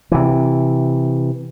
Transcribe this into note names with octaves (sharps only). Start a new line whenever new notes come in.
C3 E3